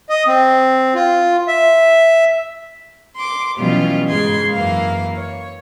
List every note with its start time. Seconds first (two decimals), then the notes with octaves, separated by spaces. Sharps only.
0.09 D#5
0.27 C4
0.95 F4
1.48 E5
3.17 C6 D6
3.58 B2 E3 F#3 G3 C#4 F4
4.09 G#2 C#3 C6 G#6
4.51 F#2 E3 A#3 F5
5.16 C#5